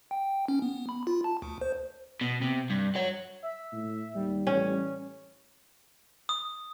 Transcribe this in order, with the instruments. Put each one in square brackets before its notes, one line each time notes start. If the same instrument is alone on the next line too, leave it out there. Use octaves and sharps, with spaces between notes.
[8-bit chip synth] G5
C#4
B3
B5
F4
A5
D2
C5
[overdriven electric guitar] B2
C3
G2
C#5 F#5
[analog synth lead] E5
[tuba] A2
[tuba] D#2 [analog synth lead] G3
[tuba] A1 [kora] C#4
[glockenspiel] D#6